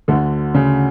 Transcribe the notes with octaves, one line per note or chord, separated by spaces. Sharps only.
D2 D3
C#3